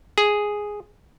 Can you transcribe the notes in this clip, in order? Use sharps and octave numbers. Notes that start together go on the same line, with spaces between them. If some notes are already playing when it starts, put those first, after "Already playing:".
G#4